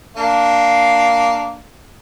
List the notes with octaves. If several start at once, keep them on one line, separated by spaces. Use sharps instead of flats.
A#3 D4 F5